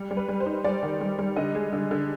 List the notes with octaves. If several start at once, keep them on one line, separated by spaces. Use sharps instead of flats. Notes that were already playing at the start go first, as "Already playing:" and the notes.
Already playing: G3
G3
B4
G3
C5
D#4
G3 D5
D#3
G3
G3
D3 D#5
G#3
D3
D3